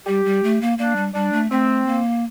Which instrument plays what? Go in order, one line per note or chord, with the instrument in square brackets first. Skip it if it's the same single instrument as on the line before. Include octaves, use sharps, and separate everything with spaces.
[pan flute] G3 [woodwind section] G4
[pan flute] G3
A3
A#3
[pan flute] A#3 [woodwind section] D4
[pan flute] G3
[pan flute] G3 [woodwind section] D4
[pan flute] A3
[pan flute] A3 [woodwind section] C4
[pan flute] A#3